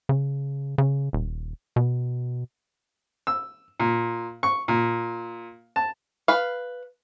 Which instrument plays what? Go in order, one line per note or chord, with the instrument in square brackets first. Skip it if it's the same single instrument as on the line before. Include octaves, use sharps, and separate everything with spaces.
[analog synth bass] C#3
C#3
D#1
B2
[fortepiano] E6
A#2
C#6
A#2
A5
[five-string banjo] B4 F5